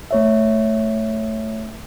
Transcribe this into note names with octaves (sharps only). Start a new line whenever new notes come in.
A3 C#5 E5